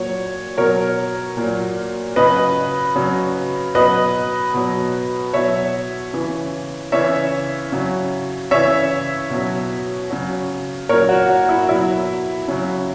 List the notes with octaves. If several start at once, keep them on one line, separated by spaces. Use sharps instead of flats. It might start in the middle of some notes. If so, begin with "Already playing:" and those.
Already playing: A#2 F#3 C#5
B2 F#3 A#4 C#5
A#2 F#3
C#3 F#3 B4 D#5
C#3 F#3
B2 F#3 B4 D#5
B2 F#3
B2 F#3 C#5 E5
C#3 E3
C#3 E3 C#5 E5
C#3 F#3
C#3 E3 C#5 E5
B2 F#3
C#3 F#3
A#2 F#3 A#4 C#5
F#4
F#4
E4
B2 F#3 E4
C#3 F#3